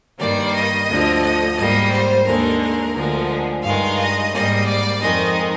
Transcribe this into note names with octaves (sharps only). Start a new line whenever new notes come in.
G2 D#3 G3 A#3 D5
D#5
D2 D3 F3
D#5
G#2 G3 A#3 D#5
C5
D#2 D3 G#3 A#4
A#4
D2 D3 F3 G#3
G2 D#3 G#3 F5
D#5
G#2 G3 A#3 D#5
D5
F2 D#3 G#3 D#5